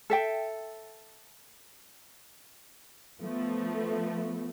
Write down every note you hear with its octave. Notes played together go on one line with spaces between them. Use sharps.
A4 E5 G5
F3 A3 B3